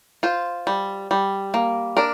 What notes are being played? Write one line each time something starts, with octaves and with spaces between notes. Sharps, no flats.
F4 C5
G3
G3
A#3
D4 A#4